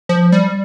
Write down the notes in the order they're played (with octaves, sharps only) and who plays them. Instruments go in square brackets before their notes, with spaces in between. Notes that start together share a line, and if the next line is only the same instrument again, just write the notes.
[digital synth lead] F3
G3